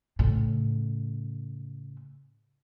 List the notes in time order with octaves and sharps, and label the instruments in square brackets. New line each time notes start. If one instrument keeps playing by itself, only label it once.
[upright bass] A2 C#3